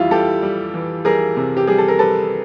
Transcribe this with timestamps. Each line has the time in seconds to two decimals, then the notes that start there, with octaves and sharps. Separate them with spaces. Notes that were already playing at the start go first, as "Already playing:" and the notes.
Already playing: F2 E3 G3 E4 F4
0.11 G3 G4 A4
0.42 G3
0.74 E3
1.05 G3 G#4 A#4
1.37 C3
1.57 G4
1.67 G3 G#4
1.78 A4
1.88 A#4
1.99 G3 A4 B4